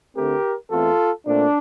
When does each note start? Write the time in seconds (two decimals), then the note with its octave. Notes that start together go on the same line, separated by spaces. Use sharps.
0.15 D2 D3 A3 C4 G4 A#4
0.70 E2 E3 A3 C4 F4 A4
1.26 A#2 A3 C4 D4